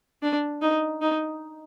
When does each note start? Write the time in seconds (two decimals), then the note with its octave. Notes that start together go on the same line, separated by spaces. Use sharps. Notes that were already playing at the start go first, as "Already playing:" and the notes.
0.23 D4
0.61 D#4
1.01 D#4